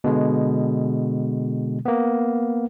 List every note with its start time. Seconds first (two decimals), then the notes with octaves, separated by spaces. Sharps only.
0.04 B2 D3 G#3
1.85 A#3 B3